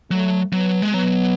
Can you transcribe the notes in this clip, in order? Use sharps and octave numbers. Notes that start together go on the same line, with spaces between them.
F#3 A3
F#3 B3
G#3
F#3 B3